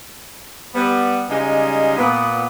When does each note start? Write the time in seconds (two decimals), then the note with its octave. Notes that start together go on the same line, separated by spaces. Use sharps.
0.74 G3 B3
1.30 C#3 G3 G#3 D#4 D#5
1.97 A#2 B3